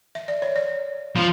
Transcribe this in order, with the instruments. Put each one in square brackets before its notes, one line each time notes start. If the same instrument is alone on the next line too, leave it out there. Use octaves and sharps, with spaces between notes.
[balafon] E5
D5
C#5
D5
[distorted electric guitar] F3